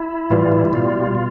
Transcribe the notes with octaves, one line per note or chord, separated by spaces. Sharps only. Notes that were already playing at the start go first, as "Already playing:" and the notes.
Already playing: E4
A2 E3 G3 F4
E4
E4
B2 G3 F4
B2